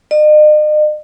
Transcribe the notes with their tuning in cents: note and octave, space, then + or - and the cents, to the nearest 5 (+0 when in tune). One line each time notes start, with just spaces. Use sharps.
D#5 -45